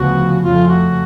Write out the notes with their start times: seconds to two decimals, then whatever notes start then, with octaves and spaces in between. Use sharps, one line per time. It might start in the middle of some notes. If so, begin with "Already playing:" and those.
Already playing: D2 C#3 F3 B3 F#4
0.42 F2 C#3 F3 A3 F4
0.68 F#4